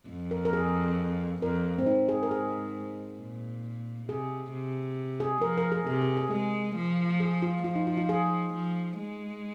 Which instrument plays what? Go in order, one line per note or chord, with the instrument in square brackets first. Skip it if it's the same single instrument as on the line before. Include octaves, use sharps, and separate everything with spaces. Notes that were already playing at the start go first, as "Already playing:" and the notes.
[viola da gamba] F2
[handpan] A#4
A#4
G#4
[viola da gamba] F2 [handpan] A#4
[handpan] C4
[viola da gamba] G#2 [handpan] D#4
[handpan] G#4
A#4
G#4
[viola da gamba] A#2
[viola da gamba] C3 [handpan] G#4
[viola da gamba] C3
[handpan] G#4
[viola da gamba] F3 [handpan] A#4
[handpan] A#4
G#4
[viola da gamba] C3 [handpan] G#4
[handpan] G#4
G#4
[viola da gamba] G#3 [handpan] G#4
[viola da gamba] F3
[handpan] G#4
F4
[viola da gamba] F3 [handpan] F4
[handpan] D#4
F4
F4
G#4
[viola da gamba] F3
G#3